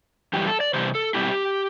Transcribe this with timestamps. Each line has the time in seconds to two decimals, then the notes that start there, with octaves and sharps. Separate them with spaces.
0.33 F#2 E3 G3 G4
0.47 A4
0.60 D5
0.74 C3 E3 G3 B3 C5
0.95 A4
1.14 B2 G3 C4 E4 G4